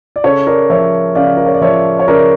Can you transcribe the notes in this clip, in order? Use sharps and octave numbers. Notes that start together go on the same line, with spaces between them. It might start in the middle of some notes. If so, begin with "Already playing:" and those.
D5
C#3 A4 C#5
A#4 D5
F3 C#5 E5
C#3 D5 F5
A#4
C#5
D5
F3 C#5 E5
C#5
C#3 A#4 D5